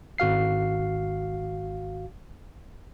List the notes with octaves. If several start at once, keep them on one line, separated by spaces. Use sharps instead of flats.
G#1 F#4 F5 C7